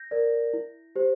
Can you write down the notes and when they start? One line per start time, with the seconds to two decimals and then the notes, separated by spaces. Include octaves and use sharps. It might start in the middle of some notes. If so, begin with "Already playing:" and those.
Already playing: G6 A#6
0.11 A#4 D5
0.53 E4
0.96 G4 C5